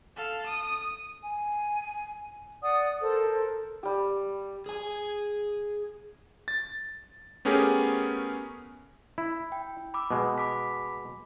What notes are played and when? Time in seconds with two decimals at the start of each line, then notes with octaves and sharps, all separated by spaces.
0.16 A4 F5
0.46 D#6
1.23 G#5
2.62 D5 F#5 D#6
3.02 A4 A#4 C5
3.83 G3 G4
4.66 G#4 G#5
6.48 A6
7.45 A3 B3 C#4 G4 G#4 A#4
9.18 E4
9.52 G5
9.94 B5 D6 E6
10.11 B2 G#3
10.38 B5 D6 B6